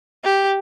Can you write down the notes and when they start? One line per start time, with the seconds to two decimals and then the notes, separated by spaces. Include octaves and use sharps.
0.24 G4